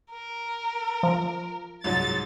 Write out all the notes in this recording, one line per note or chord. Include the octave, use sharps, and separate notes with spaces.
A#4
F3
C2 G#2 F#3 A6